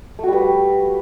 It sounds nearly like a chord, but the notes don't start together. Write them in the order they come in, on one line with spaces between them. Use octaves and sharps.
A3 F#4 G3 B4